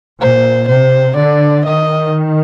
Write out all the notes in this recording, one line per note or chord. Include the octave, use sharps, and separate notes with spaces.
A#2 C5
C3 C5
D3 D5
D#3 D#5